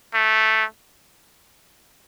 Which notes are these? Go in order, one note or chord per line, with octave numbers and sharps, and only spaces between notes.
A3